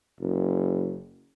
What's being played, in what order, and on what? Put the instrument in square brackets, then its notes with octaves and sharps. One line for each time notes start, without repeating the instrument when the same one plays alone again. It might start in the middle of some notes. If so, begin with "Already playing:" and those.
[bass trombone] F#1